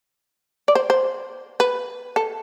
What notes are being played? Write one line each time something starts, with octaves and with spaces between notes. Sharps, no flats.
D5
C5
C5
B4
A4